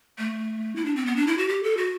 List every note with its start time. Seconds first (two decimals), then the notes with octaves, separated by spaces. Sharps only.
0.18 A3
0.76 E4
0.85 D4
0.96 C4
1.06 B3
1.16 D4
1.27 E4
1.38 F#4
1.49 G4
1.63 A4
1.77 F#4